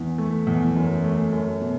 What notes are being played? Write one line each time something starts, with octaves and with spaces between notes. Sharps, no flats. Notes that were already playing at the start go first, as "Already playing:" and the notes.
Already playing: E2
A3
E2
F#2
A3
F#2
B2